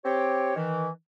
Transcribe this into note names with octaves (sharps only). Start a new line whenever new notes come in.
C4 G4 C#5
D#3 E3